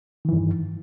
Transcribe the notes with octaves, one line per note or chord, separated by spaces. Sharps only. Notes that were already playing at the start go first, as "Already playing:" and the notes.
G2 D#3 E3